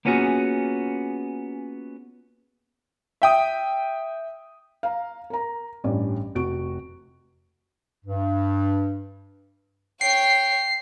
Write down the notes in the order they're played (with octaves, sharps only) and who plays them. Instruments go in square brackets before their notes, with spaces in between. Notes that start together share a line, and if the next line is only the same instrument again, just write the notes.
[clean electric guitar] A#3 B3 C#4 F4 F#4 G#4
[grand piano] E5 G5 D#6
[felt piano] F5 A#5
A#4 A#5
A1 G2 C#4 D5
F1 F#4 D7
[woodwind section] G2
[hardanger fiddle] C#5 G5 [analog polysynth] C7